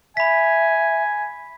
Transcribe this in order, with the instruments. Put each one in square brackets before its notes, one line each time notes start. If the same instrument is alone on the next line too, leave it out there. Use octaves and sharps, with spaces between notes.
[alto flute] E5 [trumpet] G#5 [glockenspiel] B5 B6